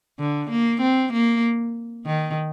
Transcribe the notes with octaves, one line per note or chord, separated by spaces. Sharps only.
D3
A#3
C4
A#3
D#3